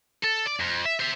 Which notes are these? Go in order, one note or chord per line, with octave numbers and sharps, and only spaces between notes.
A4
D5
F2
E5
C5 E5